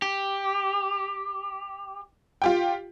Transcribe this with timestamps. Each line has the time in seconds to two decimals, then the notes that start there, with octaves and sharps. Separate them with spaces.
0.02 G4
2.42 F4 G4 G5